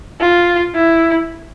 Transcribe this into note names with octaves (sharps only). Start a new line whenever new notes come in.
F4
E4